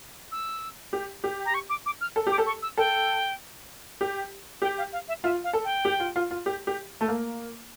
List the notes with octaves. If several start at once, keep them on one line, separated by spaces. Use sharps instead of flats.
E6
G4
G4
A#5
C#6
D6
D6
F6
A4
G4 D6
A4
C#6
E6
A4 G5
G4
G4 G5
F5
F5
E5
F4 E5
F5
A4
G5
G4
F4
F4
F4
G4
G4
A3
A#3